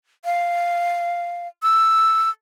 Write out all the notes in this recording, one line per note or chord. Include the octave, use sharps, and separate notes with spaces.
F5
E6